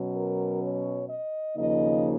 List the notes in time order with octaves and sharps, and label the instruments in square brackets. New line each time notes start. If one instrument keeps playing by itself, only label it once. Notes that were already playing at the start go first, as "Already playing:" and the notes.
Already playing: [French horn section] B2 F#3 C#4
A#4
C#5
D#5
D#2 C#3 F3 A#3 D#4 D#5